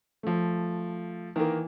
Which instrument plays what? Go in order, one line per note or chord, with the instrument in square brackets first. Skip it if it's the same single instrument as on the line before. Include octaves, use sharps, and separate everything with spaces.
[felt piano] F3 A3
[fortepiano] D#3 A#3 [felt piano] E3